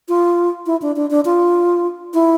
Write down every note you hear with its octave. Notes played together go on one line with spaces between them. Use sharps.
F4
E4
D4
D4
D4
F4
E4